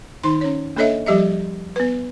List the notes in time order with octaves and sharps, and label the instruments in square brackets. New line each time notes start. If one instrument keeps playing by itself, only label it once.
[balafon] D#3 D#4 C6
C#4 C#5
A#3 D4 A4 C#5 D#5 E5
F3 G3 G4 D#5 E5
B3 B4